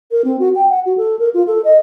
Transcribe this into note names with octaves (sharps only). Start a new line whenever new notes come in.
A#4
C4
F#4
G5
F#5
F#4
A4
A#4
F4
A4
D#5